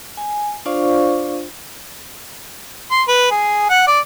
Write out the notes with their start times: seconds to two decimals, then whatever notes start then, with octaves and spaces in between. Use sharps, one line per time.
0.17 G#5
0.66 D4 F4 C5 D5 F5 C#6
2.91 C6
3.08 B4
3.31 G#4
3.70 F#5
3.87 D5